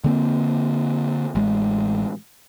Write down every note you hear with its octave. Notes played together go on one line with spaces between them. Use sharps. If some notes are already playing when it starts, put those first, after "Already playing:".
D3 A#3 C4
A1 G#3